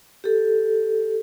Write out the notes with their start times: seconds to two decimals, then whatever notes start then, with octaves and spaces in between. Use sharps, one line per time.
0.24 G4 A4